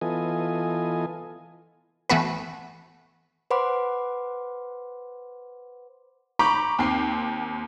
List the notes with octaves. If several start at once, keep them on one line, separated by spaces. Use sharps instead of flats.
E3 B3 F4 A4 D#5 G#5
E3 A3 B3 F#4 B4
B4 C5 F#5 B5 C6 D6
A#5 B5 C#6 D6 G6 B6
D#2 C4 G5 C7